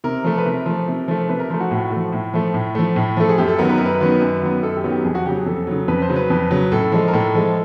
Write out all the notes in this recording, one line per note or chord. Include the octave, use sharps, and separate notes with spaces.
C3 A#4
F3 A3
B4
C3 A#4
F3 A3
C3
F3 A3
C3 B4
A#4
F3 A3 C5
F#4
A2
F3 A3
A2
F3 A3
A2
F3 A3
A2
F3 A3 A4
G#4
F#2 G4
A4
D#3 F#3 B3 A#4
B4
F#2 A#4
B4
D#3 F#3 B3
F#2
D#3 F#3 B3
F#2 A4
G4
D#3 F#3 B3
G4
F2 G#4
F#4
C#3 F#3 G4
G#4
F2 A4
C#3 F#3
F2 B4
C5
C#3 F#3
B4
F2
C#3 F#3
A2 A4
F3 G#3
A#4
A2 A4
F3 G#3